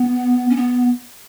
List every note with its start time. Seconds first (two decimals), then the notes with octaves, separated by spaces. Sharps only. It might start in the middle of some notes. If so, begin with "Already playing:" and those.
Already playing: B3
0.50 C#4
0.56 B3